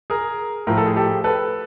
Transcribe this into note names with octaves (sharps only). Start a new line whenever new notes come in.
G#4 A#4
A2 F3 A#4
A4
G#4
G4 A4
A4 B4